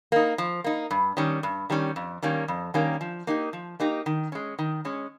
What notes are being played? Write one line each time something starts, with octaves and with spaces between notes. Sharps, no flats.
A#3 D#4
F3
A#3 D#4
G2
D#3 G3 C#4
G2
D#3 G3 C#4
F2
D#3 G3 A#3 C#4
F2
D#3 G3 A#3 C#4
F3
A#3 D#4 G4
F3
A#3 D#4 G4
D#3
G#3 C#4
D#3
G#3 C#4